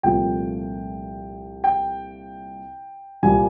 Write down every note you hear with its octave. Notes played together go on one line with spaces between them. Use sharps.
C2 A#2 F3 A3 C4 G5
G5
C2 A#2 G3 C4 G#5